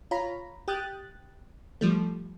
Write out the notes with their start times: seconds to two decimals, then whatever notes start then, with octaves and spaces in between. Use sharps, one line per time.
0.11 F4 C#5 A#5 B5
0.68 G4 G5 D#6 F#6 A6
1.81 F3 G3 A3